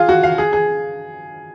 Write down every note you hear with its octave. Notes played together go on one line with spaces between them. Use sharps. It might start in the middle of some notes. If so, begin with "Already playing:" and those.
Already playing: F4 G#4
F#4
F5
G#4
G#4